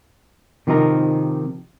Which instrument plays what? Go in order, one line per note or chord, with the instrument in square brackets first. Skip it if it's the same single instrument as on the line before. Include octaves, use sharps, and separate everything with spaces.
[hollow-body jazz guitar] C3 D#3 F3 C4 D#4 A#4